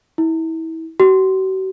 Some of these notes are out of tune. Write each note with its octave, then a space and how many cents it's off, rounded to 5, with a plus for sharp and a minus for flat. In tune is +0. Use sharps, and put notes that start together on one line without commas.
E4 -30
F#4 +45